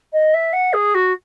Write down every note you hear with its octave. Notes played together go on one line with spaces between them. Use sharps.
D#5
E5
F#5
G#4
F#4